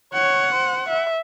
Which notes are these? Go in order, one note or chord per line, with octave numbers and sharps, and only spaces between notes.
C#5 F#5
C5
E5